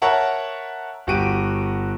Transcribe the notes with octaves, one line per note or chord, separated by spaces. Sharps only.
A#4 C#5 E5 F#5 A5 A#5
G1 F#4 G4 D7 D#7